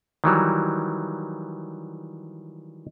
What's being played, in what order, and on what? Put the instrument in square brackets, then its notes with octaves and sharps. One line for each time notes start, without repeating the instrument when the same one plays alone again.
[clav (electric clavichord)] D#3 E3 F#3 G3